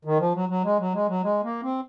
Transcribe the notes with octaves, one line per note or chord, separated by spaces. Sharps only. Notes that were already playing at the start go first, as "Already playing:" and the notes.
D#3
F3
F#3
F#3
G#3
F#3
G#3
F#3
G#3
A#3
C4